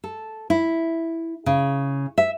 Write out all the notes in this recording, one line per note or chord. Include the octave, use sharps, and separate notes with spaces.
A4
E4
C#3
E5